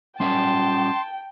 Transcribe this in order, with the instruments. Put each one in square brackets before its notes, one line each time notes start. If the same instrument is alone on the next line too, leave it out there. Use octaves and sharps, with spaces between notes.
[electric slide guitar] G3 C#4 E5 [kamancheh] G5 [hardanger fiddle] A5 [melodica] C6